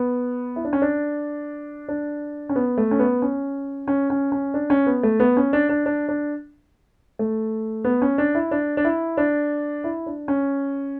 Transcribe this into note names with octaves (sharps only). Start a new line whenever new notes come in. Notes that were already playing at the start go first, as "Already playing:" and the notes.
Already playing: B3
E4
D4
C#4
D4
D4
C#4
B3
A3
C#4
B3
C#4
C#4
C#4
C#4
D4
C#4
B3
A3
B3
C#4
D4
D4
D4
D4
A3
B3
C#4
D4
E4
D4
D4
E4
D4
E4
D4
C#4